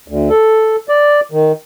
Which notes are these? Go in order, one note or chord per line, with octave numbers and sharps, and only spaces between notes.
D2
A4
D5
D#3